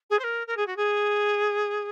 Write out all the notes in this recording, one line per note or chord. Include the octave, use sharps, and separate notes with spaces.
G#4
C5
A#4
A#4
G#4
F#4
G#4